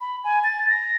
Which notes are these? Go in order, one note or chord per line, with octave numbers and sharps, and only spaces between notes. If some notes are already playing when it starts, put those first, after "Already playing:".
B5
G#5
A6
A#6